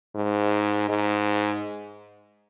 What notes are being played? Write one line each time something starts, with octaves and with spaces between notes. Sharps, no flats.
G#2
G#2